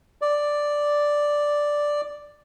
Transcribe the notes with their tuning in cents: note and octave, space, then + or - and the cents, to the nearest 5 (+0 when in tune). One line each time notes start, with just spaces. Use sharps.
D5 +0